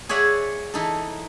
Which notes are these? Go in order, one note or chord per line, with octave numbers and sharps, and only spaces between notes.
G#4 C#5 D5 E5 F#5
E3 D#4 A4